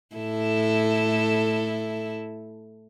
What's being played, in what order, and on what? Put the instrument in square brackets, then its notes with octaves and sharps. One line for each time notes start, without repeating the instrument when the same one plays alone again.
[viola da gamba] A2 E4 A4